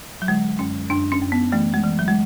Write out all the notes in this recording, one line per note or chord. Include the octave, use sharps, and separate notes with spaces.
F#3
D3 G#3
F#2 C#4
F#2 D4
C#4
F#2
B3
E3 A3
G#3
E3
F#3
G#3